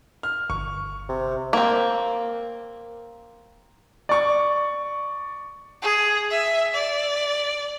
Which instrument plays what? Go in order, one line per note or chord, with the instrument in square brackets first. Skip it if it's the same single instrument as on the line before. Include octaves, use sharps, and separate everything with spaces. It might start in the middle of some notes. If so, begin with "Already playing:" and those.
[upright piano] F6
[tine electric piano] G1 [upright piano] C#6
[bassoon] C3
[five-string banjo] A#3 C4
[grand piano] D5 C#6
[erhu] G#4
E5
D5